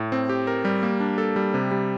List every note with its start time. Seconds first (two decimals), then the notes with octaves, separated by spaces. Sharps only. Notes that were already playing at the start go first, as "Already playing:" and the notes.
Already playing: A2
0.12 C4
0.29 G4
0.47 A#4
0.65 G3
0.83 A#3
1.00 D4
1.18 A4
1.36 G3
1.54 C3
1.71 G3